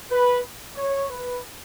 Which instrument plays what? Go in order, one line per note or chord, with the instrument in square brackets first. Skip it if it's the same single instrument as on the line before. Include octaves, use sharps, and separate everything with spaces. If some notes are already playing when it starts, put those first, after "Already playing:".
[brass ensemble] B4
C#5
B4